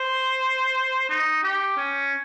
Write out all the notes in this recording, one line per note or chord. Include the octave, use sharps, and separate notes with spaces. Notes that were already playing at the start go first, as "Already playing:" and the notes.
Already playing: C5
D#4
G4
C#4